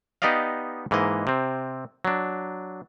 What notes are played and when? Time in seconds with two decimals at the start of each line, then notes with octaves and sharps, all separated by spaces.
0.22 B3 D#4 G4 D5 D#5 F5
0.91 G#2 E3 A#3 D#5
1.27 C3 C4
2.05 F#3 D4